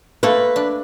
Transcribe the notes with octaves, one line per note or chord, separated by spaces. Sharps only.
A3 A#3 A4 B4
D4